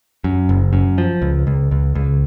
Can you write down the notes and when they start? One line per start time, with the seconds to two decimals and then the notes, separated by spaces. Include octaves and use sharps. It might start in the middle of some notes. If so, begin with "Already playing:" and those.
0.24 F#2
0.49 F#1
0.73 F#2
0.98 F3
1.22 C#2
1.47 C#2
1.71 C#2
1.95 C#2